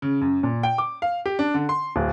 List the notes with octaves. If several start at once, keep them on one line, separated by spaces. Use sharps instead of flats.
C#3
F#2
A#2
G5
D6
F5
G4
D4
D3
C6
D1